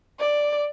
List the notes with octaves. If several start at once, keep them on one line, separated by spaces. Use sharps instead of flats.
D5